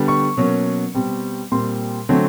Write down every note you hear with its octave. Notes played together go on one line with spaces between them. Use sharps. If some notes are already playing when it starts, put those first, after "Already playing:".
Already playing: D3 G3 B3
C#6
B2 F#3 A#3 C#4
B2 G3 C4
A#2 G3 C4 C6
D3 F#3 A3 C4